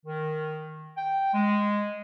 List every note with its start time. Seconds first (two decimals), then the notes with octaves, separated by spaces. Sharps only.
0.06 D#3
0.97 G5
1.34 G#3